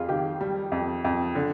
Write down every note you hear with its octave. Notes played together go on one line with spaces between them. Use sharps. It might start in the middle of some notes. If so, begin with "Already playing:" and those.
Already playing: F2 F4 G#4
D#3 G4
G3
F2
F2
D3